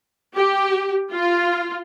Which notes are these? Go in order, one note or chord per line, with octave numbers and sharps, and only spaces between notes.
G4
F4